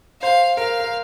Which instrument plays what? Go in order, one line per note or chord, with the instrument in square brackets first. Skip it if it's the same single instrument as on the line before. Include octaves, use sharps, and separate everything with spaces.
[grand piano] C5 [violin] F5
[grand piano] A#4 [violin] F5
[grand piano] A#4